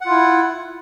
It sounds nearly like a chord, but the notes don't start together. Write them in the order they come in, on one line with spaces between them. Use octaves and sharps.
F#5 F4 E4